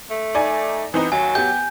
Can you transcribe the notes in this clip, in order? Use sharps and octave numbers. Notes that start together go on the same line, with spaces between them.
A3
D#4 D5 G#5
E3 B3 C4 D#4
D#2 F#3 G#5
B3 G4 G6